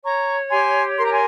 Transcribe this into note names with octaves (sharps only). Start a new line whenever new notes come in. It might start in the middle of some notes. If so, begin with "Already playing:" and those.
C#5 A#5 C#6
G4 G#5 C6
A#4 C6
A#5
G#5 C6